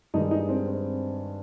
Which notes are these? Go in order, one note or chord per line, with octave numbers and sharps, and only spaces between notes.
G2 D#3 G#3 D#4
D#4
C4
C4